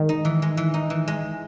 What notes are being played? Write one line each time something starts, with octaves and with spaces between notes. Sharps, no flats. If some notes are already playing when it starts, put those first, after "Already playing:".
Already playing: D#3 G#3
D#4
E3
G#3
E3
D#4
E3
G#3